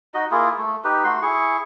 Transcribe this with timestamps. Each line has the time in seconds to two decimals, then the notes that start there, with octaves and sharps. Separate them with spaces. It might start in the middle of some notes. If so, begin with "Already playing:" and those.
0.14 D#4 F#4 D#5
0.31 A#3 E4 F4 G#4
0.58 A3
0.84 D#4 G4 B4
1.04 A3 F#4 C6
1.22 E4 G#4 C#6